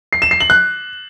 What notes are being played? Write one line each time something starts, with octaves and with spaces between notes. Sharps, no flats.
C7
E7
C7
F#7
F#6